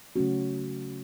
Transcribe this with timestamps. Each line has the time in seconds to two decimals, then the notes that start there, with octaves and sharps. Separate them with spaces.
0.16 C#3 F#3 A3 C#4 F#4